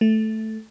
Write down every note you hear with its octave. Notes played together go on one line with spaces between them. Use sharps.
A3